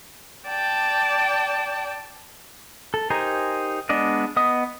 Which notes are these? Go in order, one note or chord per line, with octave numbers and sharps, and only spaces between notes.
D5 G5 A5
A4
D#4 G4 A#4 C5 G#5
G#3 B3 D4 D5 D#5
B3 D#5 D#6